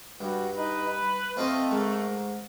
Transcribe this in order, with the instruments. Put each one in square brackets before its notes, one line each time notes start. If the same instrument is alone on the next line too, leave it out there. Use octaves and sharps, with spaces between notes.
[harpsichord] G2 [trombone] G3 [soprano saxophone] F#4
[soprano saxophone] D#4 [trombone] B4
[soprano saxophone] B5
[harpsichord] F3 C4 F4 [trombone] A3 [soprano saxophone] D#5
[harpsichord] G#2 [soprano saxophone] A#4